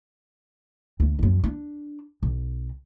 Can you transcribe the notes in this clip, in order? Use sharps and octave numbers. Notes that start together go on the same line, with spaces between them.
D2
F#2 F3
D4
B1